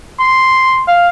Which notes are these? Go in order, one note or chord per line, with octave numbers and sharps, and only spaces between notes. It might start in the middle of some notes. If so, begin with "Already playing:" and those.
C6
F5